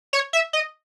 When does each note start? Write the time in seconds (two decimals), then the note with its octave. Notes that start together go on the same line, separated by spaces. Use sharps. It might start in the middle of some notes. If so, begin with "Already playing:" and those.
0.13 C#5
0.33 E5
0.53 D#5